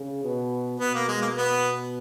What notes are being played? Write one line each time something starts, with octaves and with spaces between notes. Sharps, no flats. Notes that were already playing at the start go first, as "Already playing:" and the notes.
Already playing: C#3
B2
B2 B3
A#3
G#3
A#3
B3